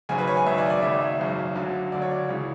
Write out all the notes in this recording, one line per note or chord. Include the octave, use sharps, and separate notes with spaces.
G#1 F#2 C#3 G#5
B4
C#5
G#5
G#1 F#2 C#3 E5
D5
D5
G#1 F#2 C#3 E5
E5
G#1 F#2 C#3
D2 D3 F#3
D2 D3 F#3 D5
C#5
D5
C#2 C#3 E3